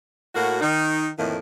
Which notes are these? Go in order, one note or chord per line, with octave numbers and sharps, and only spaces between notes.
A2 A#3 F#4
D#3 D#4
F2 A2 D#3 E3 A#3